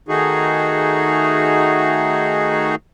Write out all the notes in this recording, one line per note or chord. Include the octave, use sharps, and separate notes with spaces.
D#3 A3 D#4 F#4 G#4